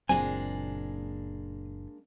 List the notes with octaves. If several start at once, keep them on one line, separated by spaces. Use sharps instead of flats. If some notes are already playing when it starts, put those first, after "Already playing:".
F#1 A#2 G#3 A#3 C4 D4 G#5